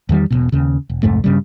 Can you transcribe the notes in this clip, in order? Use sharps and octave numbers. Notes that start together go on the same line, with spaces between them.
E2 D#3 G3
E1 B1 B2
D#2 C#3
E1
C2 F2 G#2 A3
G2 C#3 G3